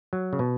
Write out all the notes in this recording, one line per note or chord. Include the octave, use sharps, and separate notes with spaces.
F#3
C#3
B2